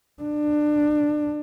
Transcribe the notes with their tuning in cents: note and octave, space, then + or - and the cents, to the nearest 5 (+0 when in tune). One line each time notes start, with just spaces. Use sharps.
D4 +20